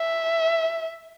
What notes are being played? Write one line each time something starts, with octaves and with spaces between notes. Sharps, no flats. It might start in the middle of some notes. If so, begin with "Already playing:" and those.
Already playing: E5